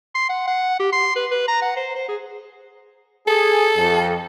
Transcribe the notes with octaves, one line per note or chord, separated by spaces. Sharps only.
C6
F#5
F#5
G4
C6
B4
B4
A#5
F#5
C5
C5
G#4
G#4 A4
F2